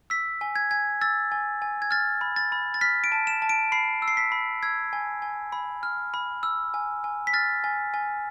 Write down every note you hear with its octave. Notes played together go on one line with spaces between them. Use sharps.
E6 B6
G#5
G#6
G#5 G#6
E6 A6
G#5
G#5
G#6
F6 A6
B5
A6
B5
A6
F6 B6
D7
A5
E7
A5
D7
B5 C7
E6
C7
B6
B5
E6 G#6
G#5
G#5
B5
F6
B5
E6
G#5
G#5
B6
F6 A6
G#5
G#5